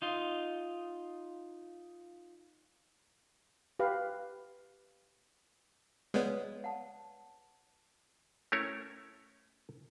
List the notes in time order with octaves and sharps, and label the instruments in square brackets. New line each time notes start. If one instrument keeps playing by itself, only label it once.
[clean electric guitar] D#4 F4
[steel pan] G4 B4 F5
[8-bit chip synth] G#3 B3 [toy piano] B4 C#5 D5
[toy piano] F#5 A5
[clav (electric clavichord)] A3 C#4 E4 A#4 C#5